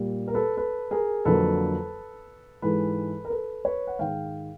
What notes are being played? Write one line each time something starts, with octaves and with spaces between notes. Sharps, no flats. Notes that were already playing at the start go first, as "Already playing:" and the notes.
Already playing: A#2 G3 A#3
A#4
A4 B4
A4 B4
G#4 A#4
F2 D3 F#3 A#3 A4 B4
G#2 E3 G#3 A4 B4
A#4
A4 B4
B4 C#5
F#5
G#2 D#3 G#3 F5 G5